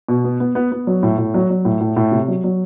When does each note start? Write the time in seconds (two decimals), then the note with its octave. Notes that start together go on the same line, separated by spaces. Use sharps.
0.08 B2
0.24 B3
0.40 B3
0.55 B3
0.72 B3
0.87 F#3
1.03 A2
1.18 A2
1.34 F#3
1.50 F#3
1.65 A2
1.80 A2
1.97 A2
2.12 C3
2.28 F#3
2.44 F#3